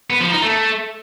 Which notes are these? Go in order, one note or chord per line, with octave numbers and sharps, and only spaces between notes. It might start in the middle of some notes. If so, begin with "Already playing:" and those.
B3
F3
D#4
A3